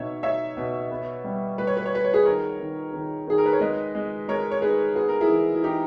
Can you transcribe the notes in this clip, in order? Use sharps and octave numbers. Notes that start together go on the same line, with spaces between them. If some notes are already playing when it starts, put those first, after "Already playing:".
Already playing: B2 D#4 C#5 E5
D#4 C#5 E5
B2
B3
G3
G3 B4
C#5
B4
C#5
B3 B4
C#5
G#4 B4
D#3 A#4 C#5
D#3
D#3
D#3 G#4
A#4
B4
C#5
G#3 B4 D#5
G#3
G#3 A#4 C#5
C#5
D#4 G#4 B4
B3 G#4
A#4
E4 G#4
E3
E4
E3 D#4 G4